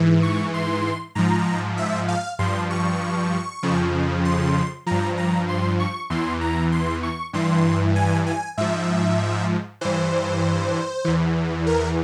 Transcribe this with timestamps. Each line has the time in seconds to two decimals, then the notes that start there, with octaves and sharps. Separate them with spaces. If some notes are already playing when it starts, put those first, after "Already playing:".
Already playing: G#2 E3
0.23 C#6
0.54 C6
1.15 G#2 F3 A#5
1.77 E5
2.08 F5
2.39 G2 F3 C6
2.70 C#6
3.63 F2 C#3 F3
4.25 C6
4.86 G2 F3 A#5
5.17 A#5
5.49 C6
5.80 C#6
6.10 E2 E3 C6
6.41 A#5
6.72 C6
7.03 C#6
7.33 G2 E3 C6
7.96 G#5
8.26 G#5
8.57 G#2 F3 E5
9.81 G2 E3 C5
11.05 E2 E3
11.67 A#4